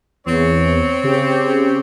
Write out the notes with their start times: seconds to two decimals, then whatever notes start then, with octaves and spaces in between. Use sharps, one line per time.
0.26 E2 C4 C#5
1.03 C#3 G4